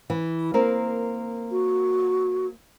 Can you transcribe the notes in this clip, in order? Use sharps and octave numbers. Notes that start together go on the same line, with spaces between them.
E3
A#3 C4 A#4
F#4